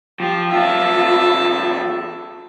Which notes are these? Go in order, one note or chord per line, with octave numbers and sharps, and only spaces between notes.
F3 G4
E2 F4 E5 A5